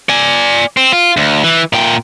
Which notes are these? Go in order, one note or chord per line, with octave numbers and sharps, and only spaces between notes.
D5 G#5
C4
F4
D2
E3
A#2 G5